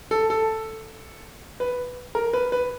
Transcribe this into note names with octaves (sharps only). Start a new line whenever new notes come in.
A4
A4
B4
A#4
B4
B4